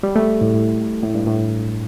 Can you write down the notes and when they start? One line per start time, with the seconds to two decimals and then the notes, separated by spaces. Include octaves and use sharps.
0.03 G3
0.16 A3
0.41 A2
0.54 A2
1.03 A2
1.15 G2
1.27 A2